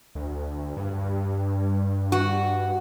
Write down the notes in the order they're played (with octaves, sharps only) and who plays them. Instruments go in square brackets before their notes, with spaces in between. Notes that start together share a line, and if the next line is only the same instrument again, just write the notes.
[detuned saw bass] D2
G2
[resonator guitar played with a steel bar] F#4